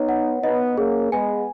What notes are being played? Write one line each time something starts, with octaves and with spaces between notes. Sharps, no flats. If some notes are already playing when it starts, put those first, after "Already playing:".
Already playing: B3 D#4 C#5
F#5
B3 D#4 D#5
A#3 C#4 G#4
G#3 B3 G#5